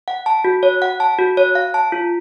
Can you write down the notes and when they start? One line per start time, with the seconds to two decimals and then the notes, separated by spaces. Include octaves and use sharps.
0.08 F#5
0.26 A5
0.44 F#4
0.63 C#5
0.82 F#5
1.00 A5
1.18 F#4
1.37 C#5
1.55 F5
1.74 A5
1.92 F4